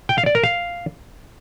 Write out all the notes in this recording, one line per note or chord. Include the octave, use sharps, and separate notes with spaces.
G5
F5
D5
A#4
F5